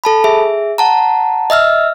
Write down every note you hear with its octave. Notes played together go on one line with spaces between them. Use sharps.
A4 A5 B5
G#4 E5
F#5 A5 A#5
D#5 E5 E6 F6